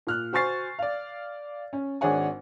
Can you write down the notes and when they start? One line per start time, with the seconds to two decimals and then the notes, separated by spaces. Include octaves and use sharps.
0.07 A#2 F6 F#6
0.33 F#4 C5 G#5 C#6 A6 C7
0.79 D5 F5
1.73 C#4
2.01 G#1 D4 G#4 C#5 F#5 G#5